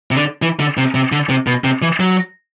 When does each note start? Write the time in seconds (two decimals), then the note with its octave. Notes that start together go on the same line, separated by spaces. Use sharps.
0.11 C3
0.16 D3
0.42 E3
0.60 D3
0.77 C3
0.95 C3
1.12 D3
1.29 C3
1.47 B2
1.64 C3
1.82 E3
2.00 F#3